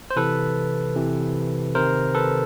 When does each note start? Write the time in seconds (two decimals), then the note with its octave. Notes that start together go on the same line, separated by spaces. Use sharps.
0.10 C5
0.16 C3 E3 A4 B4
0.95 C3 E3
1.75 C3 D#3 A#4 C5
2.15 A4 B4